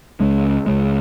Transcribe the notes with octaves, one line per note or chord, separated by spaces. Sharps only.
C#2 C#3 G#3
C#2 C#3 G#3